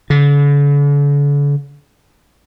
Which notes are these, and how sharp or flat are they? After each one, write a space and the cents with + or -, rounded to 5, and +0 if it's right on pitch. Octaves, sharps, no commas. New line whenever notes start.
D3 -40